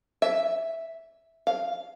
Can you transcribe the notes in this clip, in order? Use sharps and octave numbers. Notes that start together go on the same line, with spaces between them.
E5
F5